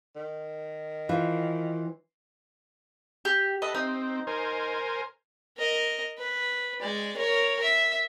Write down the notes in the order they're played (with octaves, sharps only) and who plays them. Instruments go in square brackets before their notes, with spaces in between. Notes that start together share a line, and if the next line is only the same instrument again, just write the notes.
[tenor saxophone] D#3
[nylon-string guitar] E3 F4 C5
[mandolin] G4
[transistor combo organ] A4 B4 [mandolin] D#5
[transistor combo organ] C4 [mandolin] D#4
[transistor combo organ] A#4 C5 G#5
[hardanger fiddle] A#4 D#5
B4
G#3 D5
A#4 C#5
E5